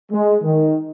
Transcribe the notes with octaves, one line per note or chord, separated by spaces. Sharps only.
G#3
D#3